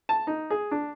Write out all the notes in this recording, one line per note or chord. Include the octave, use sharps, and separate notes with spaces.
A5
D#4
G#4
D4